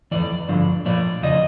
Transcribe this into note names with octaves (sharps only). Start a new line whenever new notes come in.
F2 C3 E3 D5
G2 D3 F3
A#2 F3 D5
F2 C#3 D#5